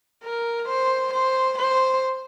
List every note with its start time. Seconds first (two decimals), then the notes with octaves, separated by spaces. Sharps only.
0.24 A#4
0.69 C5
1.14 C5
1.59 C5